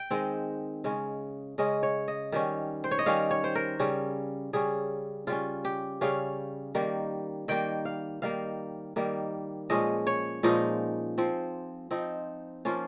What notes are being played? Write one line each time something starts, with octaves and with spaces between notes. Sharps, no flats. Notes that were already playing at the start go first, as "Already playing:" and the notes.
Already playing: G5
D#3 G#3 C4
C#3 G#3 C#4
C#3 G#3 C#4 D#5
C#5
D#5
D#3 G3 C#4
C5
C#5
D#5
D#3 G3 C#4 F5
C#5
C5
A#4
C#3 G3 C#4
C#3 G3 C#4 G#4
C#3 G3 C#4 F4
G4
C#3 G3 C#4 F5
D#3 G3 A#3
D#3 G3 A#3 G5
F5
D#3 G3 A#3 F5
D#3 G3 A#3
A#2 F3 G#3 C#4 D#5
C#5
A#2 F3 G#3 C#4 D#4
F3 C4
F3 C4 D#4
F3 A#3 C#4 F4